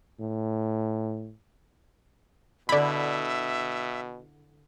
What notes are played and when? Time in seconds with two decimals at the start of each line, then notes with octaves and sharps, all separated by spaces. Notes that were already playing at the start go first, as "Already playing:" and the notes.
0.20 A2
2.69 B2 D3 E4 D5 E5 B5